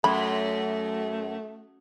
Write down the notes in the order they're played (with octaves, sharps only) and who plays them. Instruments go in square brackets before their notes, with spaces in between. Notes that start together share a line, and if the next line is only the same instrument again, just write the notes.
[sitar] F#2 [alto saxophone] A3 [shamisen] B5